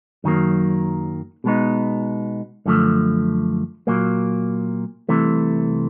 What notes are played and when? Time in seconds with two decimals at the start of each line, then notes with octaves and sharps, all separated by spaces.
0.24 F#2 D#3 F#3 A#3
1.44 B2 G#3 B3 D#4
2.66 F#2 D3 F3 A3
3.87 A#2 F#3 A#3
5.09 C2 C3 E3 A3